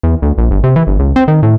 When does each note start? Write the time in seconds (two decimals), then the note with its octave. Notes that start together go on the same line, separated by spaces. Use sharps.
0.03 E2
0.22 D2
0.38 A#1
0.51 G1
0.64 C3
0.76 E3
0.87 G1
0.99 C#2
1.16 C4
1.28 D#3
1.43 A2